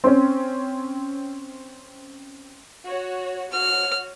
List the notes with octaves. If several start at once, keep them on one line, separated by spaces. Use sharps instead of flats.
C4 C#4
F#4 C#5
F#4 C#5 F6